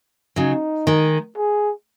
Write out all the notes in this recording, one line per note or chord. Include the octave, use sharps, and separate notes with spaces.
C#3 F#3 D#4
D#3 G#3
G#4